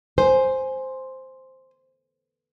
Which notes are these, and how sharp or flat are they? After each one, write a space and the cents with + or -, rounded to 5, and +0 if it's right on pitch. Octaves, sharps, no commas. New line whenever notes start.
C5 +0 G#5 +0